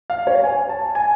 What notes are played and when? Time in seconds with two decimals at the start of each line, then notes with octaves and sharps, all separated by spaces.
0.10 F5
0.27 C#5
0.44 G#5
0.69 A5
0.95 G#5